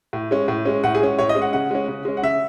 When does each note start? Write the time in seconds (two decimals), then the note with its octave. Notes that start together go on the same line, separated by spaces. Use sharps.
0.13 A2
0.31 G#3 C#4
0.48 A2
0.65 G#3 C#4
0.84 A2 F#5
0.95 G#4
1.00 G#3 C#4
1.19 A2 C#5
1.29 D#5
1.35 G#3 C#4
1.42 F#5
1.53 C#3 F#5
1.71 G#3 C#4
1.88 C#3
2.05 G#3 C#4
2.17 F#5
2.23 C#3 E5